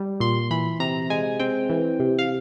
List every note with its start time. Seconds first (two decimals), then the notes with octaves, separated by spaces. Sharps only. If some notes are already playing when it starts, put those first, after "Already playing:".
Already playing: G3
0.20 A#2 C6
0.50 E3 B5
0.80 C3 A#5
1.10 G#3 G#5
1.39 C4 G5
1.70 E3
2.00 C3
2.19 F5